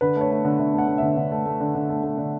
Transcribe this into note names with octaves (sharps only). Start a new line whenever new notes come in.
D3 B4
A3 C#5
A3
D3
D3 E5
A3 F#5
A3
D3 E5
D3
A3
A3
D3
D3
A3
A3
D3